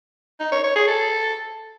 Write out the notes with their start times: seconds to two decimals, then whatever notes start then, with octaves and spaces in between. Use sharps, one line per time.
0.40 D#4
0.52 C#5
0.64 C#5
0.75 G#4
0.87 A4